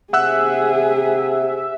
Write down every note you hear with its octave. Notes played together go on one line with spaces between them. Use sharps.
C3 G#4 E5 F#5 E6 F#6